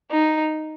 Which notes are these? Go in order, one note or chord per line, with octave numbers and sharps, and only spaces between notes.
D#4